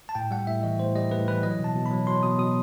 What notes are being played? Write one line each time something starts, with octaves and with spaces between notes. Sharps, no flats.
A5
A2 G5
G3 F#5
A2 E5
E3 D#5
A2 C5
G3 D#5
A2 B4
E3 B4
F#3 D#5
B2 A5
B2
B5
F#3
F#3 C6
B2 D#6
B2 D#6